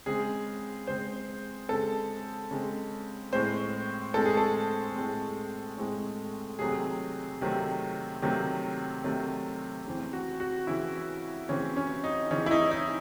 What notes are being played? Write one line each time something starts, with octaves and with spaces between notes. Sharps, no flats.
C#3 G#3 C4 G#4
C#3 G#3 C4 C5
C#3 G#3 C4 A4
C#3 G#3 C4
A2 G#3 C4 C5
A2 G#3 C4 A4
G#4
A4
A2 G#3 C4
A2 G#3 C4
C3 D#3 F#3 A3 C4 G#4
C3 D#3 F#3 A3 C4
C3 D#3 F#3 A3 C4
C3 D#3 F#3 A3 C4
C#3 E3 C4
F#4
F#4
C#3 E3 C4 E4
C#3 E3 C4 C#4
C#4
D#4
C#3 E3 C4 C#4
E4
D#4
D#4